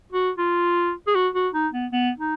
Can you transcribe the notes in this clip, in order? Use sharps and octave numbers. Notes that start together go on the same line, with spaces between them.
F#4
F4
G#4
F#4
F#4
D#4
B3
B3
D#4